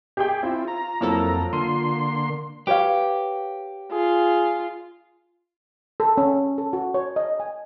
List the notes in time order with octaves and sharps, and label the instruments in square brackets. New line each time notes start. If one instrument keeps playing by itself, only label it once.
[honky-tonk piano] G4 G#4 G5
[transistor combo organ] C4 E4 [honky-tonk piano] F4
[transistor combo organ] A#5
[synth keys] F2 E4 A4 [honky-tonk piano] F3 F#3 A#3
[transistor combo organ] D3 A#3 C6 [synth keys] F4 [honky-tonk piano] D#7
[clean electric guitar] G4 [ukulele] B4 C#5 F5
[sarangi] F4 [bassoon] G#4
[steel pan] A4
C#4
A4
F#4
C#5
D#5
G#5